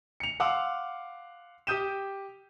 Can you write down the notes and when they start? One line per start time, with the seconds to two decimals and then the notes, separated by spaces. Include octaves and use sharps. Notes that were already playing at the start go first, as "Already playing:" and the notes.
0.20 C#7 F7
0.40 F5 F#5 C6 D6 E6
1.67 G4 G5 D#6 G6 D#7 E7